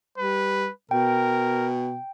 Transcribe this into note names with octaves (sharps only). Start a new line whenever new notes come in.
G3 B4
B2 A#4 G5